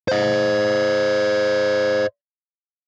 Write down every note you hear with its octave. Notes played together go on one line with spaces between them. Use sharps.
C5 D#5